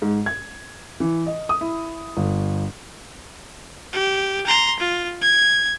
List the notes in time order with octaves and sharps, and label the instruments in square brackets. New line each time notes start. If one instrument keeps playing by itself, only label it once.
[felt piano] G#2
G#6
E3
D#5
D#6
E4
G1
[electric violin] G4
A#5 C6
F4
G#6